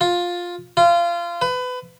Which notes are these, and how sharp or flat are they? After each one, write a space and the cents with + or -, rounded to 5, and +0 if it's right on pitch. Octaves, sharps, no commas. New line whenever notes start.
F4 +10
F4 -25
B4 +25